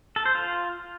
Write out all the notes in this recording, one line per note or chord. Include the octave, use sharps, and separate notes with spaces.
A4
C5
F4